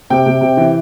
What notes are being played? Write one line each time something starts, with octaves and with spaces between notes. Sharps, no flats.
C3 G5
C3
C3
E3